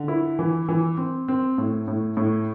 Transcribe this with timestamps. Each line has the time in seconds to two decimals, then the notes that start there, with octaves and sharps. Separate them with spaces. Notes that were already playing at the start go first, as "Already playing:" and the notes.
Already playing: D3
0.08 E4
0.39 E3
0.69 E3
0.97 C4
1.28 C4
1.58 A2
1.88 A2
2.17 A2